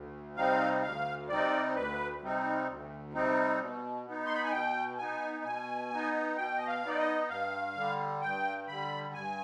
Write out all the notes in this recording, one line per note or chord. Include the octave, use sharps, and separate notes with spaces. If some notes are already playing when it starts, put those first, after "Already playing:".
Already playing: D2
C3 G3 C4 D#4 F5
D2 F5
C3 G3 C4 D#4 D5
D2 B4
C3 G3 C4 D#4
D2
C3 G3 C4 D#4
B2
B3 D#4
C6
B5
G#5
B2 G5
B3 D#4 G#5
B2 G#5
B3 D#4
B2 G5
D#5
F5
B3 D#4 D5
D#5
G2 F5
D3 G3
G2 G5
D3 G3 B5
G2 G#5